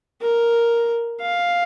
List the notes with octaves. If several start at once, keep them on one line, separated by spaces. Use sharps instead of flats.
A#4
F5